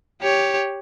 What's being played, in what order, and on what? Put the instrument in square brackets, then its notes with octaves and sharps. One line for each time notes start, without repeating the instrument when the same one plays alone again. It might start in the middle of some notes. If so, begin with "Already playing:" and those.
[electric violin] G4 C#5